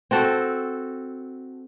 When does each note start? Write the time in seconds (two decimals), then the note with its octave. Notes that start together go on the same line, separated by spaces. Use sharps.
0.11 C4 F#4 A4